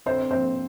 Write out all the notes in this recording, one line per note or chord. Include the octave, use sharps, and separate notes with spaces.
D3 C4 C5
F3 A#3 C4 C5